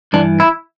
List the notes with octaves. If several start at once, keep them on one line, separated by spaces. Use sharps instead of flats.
G2 E3 D4
E4